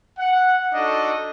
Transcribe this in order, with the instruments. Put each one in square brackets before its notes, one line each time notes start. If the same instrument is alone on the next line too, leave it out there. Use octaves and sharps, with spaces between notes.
[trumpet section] F#5
D4 D#4 F#4 A4 D#5